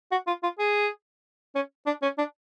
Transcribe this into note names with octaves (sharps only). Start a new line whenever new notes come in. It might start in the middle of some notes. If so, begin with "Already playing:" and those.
F#4
F4
F4
G#4
C#4
D4
C#4
D4